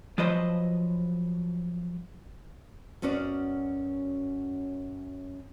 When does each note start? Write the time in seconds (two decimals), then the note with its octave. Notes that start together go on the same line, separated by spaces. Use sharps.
0.18 F3 F#3 B4 C5 D#5
3.02 F#2 B3 C#4 F#4 D5